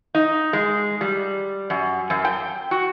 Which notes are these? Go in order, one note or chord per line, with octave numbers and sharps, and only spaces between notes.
D#4
G#3
G3
F#2
F#2
G5
F#4